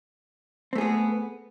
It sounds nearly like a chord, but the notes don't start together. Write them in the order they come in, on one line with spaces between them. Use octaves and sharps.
C4 A3 G#4 B3